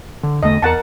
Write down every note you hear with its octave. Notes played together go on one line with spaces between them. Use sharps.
D3
E2 D3 A3 D#5
E2 A#4 F#5 A5